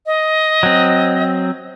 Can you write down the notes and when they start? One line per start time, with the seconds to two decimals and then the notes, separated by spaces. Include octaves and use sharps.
0.06 D#5
0.63 F#3 C4